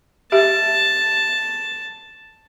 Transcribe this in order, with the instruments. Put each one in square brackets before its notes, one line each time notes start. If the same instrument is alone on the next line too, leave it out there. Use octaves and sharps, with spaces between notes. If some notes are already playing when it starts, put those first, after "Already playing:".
[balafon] G4 E5 [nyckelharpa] A5